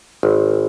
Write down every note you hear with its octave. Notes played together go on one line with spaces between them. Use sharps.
G#1